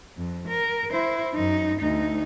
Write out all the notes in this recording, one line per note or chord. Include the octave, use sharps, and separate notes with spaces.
F2
A#4
E4 C5
F#2 D#4
D2 D#4